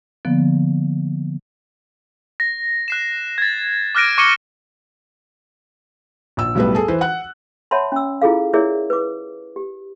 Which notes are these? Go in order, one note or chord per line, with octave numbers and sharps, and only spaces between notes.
D3 F3 A#3 B3
A#6
F#6 C7 E7
G#6 A6
D6 F6 F#6 A#6 D7 D#7
C#6 D6 C#7 D#7 G7
A#1 E6
B1 A2 G3 B3 B4
G#4 A4
E3 B4 C5
F#5 F#6
C#5 E5 F#5 A5 B5 C6
C#4 E6
E4 F4 G#4 A4 F5
E4 G#4 A#4 C#5 D5 E5
B4 D6
G4